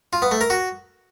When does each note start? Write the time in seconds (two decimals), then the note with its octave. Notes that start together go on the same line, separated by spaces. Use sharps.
0.13 F4
0.22 B3
0.31 A3
0.41 A#4
0.50 F#4